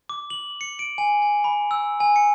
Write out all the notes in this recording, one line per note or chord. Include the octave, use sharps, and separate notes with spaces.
D6
F#7
C#7
D7
G#5
G#5
B5
E6
G#5
C#7